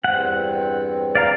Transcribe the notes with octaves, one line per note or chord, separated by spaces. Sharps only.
E2 G2 C4 F#5
D5 F5 A#5